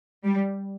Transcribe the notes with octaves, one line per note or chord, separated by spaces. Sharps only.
G3